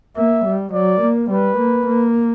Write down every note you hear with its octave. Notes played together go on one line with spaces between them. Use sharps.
A#3 E5
G3
F#3 D5
A#3
G3 B4
A#3
A#3